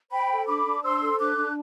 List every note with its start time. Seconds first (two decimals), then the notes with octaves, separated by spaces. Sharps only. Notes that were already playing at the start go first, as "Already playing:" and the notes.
0.11 C5 G5 B5
0.29 A4
0.47 D4 B5 D6
0.66 D4
0.83 C5 C6 E6
1.01 A4
1.19 D4 D6 F#6
1.37 D4